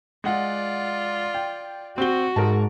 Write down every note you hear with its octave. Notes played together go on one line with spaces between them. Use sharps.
G#3 F4 D5 F#5
G5
C4 F#4 G7
G#2 A#4 A5